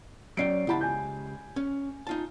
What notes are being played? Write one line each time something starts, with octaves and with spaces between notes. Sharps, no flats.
F#3 C#4 D5 G5 C7 D7
C#2 E4 G4 F#5 A5 B5
G#5 G6
C#4
D#4 F4 A5